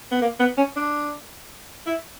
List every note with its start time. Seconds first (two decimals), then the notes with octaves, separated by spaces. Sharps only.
0.12 B3
0.22 A#3
0.39 B3
0.58 C#4
0.76 D4
1.86 E4